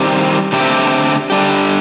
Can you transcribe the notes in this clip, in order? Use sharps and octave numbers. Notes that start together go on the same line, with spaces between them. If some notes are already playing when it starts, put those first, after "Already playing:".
Already playing: D#3 G3 C4 G4
D3 A3 C4 G4
D3 G3 D4 G4